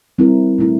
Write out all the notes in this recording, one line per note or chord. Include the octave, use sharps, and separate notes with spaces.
G3 C4 E4 A#4
A#2 A3 E4